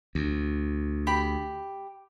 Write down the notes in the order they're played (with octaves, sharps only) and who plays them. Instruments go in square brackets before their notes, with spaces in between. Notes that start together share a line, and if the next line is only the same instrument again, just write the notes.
[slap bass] D2
[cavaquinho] G4 B5